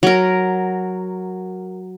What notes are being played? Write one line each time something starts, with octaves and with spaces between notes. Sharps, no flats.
F#3 A#4